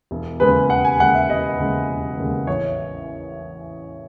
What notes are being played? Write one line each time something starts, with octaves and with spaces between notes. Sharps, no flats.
E1
D#2 C#3 G#3 B4
E1 F#5
G#5
D#2 C#3 G#3 F#5
E5
E1 D#5
D#2 C#3 G#3
E1
D#2 C#3 G#3
A1 C#5